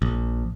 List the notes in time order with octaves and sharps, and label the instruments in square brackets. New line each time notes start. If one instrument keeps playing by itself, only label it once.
[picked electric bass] A#1